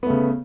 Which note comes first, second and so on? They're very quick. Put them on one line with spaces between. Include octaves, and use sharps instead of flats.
B3 A3 C#3